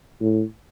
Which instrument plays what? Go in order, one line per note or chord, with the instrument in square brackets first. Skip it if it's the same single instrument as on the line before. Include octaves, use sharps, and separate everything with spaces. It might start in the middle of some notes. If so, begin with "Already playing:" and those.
[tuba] A2